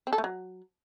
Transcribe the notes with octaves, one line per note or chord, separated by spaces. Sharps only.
C4
A4
A3
F#3